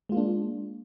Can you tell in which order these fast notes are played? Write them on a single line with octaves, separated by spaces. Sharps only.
G#3 F4 A#3 D4